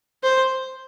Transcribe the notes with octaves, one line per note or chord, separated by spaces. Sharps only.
C5